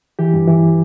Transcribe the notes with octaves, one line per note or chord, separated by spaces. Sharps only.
E3 G4
G2
E3